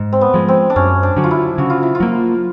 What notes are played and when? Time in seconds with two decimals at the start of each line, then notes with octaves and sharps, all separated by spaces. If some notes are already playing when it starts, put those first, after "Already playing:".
Already playing: G#2
0.13 C4
0.21 B3
0.34 F3 G#3
0.48 C4
0.70 D4
0.76 F#2 C#4
1.03 D4
1.16 D3 F#3
1.24 F4
1.31 E4
1.58 C#3 F#4
1.70 F4
1.83 E4
1.95 F4
2.00 F#3 A#3